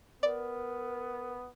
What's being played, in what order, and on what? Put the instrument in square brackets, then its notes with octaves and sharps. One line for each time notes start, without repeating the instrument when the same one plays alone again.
[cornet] B3 [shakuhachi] A#4 [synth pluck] D5